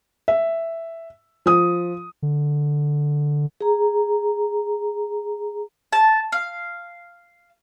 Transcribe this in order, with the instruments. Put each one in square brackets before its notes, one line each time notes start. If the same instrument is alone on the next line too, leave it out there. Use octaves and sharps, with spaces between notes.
[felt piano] E5
F3 D#6
[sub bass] D3
[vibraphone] G#4 A#5
[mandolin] A5
F5